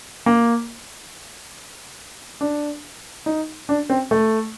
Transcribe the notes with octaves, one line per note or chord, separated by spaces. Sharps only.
A#3
D4
D#4
D4
C4
A3